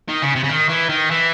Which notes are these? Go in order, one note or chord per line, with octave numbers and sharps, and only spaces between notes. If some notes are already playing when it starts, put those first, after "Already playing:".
D#3
C#3
C3
C#3
D#3
E3
D#3
E3